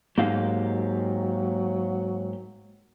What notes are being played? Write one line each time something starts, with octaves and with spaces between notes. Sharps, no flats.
G#2 F#3 A#3 G4 F5